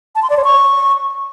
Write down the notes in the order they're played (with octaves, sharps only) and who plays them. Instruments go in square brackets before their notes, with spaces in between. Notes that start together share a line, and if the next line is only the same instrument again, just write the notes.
[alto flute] A5
C6
D5
C#5
C#6